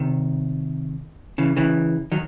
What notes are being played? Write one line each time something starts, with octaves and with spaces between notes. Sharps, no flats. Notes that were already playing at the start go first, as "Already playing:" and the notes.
Already playing: C3 D#3
C#3 E3
C#3 E3
D#3 F#3